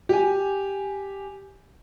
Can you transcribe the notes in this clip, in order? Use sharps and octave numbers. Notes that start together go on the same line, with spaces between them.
G4 G#5